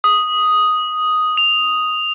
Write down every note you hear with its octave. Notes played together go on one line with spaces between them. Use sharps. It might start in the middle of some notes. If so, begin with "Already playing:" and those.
D#6
F7